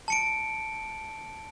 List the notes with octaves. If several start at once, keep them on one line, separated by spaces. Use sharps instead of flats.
A5 C#7 D7